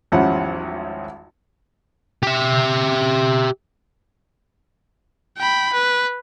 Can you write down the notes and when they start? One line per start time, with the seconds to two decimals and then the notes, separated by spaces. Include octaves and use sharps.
0.12 G#1 E2 F3 G3 C#4 F#5
2.23 G4 E5
5.38 G5 B5
5.73 B4